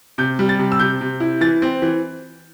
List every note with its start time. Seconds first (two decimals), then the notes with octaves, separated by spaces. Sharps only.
0.18 C3 G6
0.39 G3
0.49 A6
0.59 C3
0.72 E6
0.80 C3 G6
1.01 C3
1.20 E4
1.41 E3 A6
1.62 C4
1.82 E3